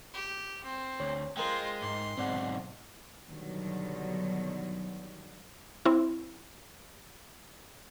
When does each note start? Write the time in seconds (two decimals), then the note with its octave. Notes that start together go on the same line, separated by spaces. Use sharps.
0.14 G4
0.63 C4
1.00 D2 C#5
1.37 G#3 F4 A#4 C5 G5
1.82 G#2 C6
2.18 B1 G#2 C4 D5 F#5
3.28 B2 D3 D#3 F#3 G3
5.85 C4 E4